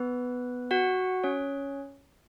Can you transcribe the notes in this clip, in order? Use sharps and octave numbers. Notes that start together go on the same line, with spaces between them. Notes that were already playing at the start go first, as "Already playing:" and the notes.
Already playing: B3 B4
F#4 F#5
C#4 C#5